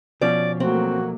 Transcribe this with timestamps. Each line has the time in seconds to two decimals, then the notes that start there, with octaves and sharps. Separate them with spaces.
0.21 B2 F3 C#4 D5
0.60 F#3 A3 A#3 C4 F#4